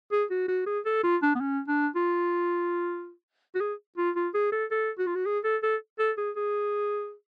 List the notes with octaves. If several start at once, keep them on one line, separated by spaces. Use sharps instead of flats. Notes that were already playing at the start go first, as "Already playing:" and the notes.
G#4
F#4
F#4
G#4
A4
F4
D4
B3
C#4
D4
F4
F#4
G#4
F4
F4
G#4
A4
A4
F#4
F4
F#4
G#4
A4
A4
A4
G#4
G#4